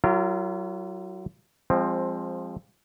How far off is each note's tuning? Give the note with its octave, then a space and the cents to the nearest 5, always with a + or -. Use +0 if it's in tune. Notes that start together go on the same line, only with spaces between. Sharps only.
F#3 +20 F4 -40 A#4 -20
F3 +0 G#3 -30 C4 +15